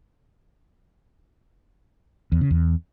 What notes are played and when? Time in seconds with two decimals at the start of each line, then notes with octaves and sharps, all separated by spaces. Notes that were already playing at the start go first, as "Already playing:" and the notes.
2.32 E2
2.41 C#3
2.50 E2